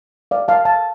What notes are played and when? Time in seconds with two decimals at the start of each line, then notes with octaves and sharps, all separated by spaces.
0.31 D5 F5
0.48 F5 A5
0.65 F5 A5